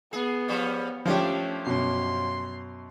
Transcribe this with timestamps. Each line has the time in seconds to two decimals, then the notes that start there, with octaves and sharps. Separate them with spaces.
0.13 B3 G#4
0.48 F3 G3 C#4
1.06 F3 A3 A#3 C#4 D4 G4
1.67 F#2 B2 C6